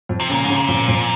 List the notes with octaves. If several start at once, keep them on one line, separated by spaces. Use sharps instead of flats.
F2
C3
A#2 C#3
G#2 C#3
A#2
F2
F2